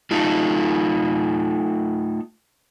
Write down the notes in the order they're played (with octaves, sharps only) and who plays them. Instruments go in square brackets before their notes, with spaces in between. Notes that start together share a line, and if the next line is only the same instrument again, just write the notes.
[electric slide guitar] A3 D#4 F4